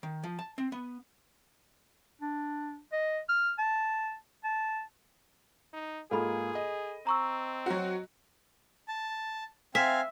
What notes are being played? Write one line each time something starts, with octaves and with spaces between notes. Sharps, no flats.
D#3
F3
A5
C4
B3
D4
D#5
F6
A5
A5
D#4
G#2 A#3 F4 G#4 A4 B5
D#5
C4 A#5 C#6 E6
F#3 F#4
A5
C4 E5 F5 G#5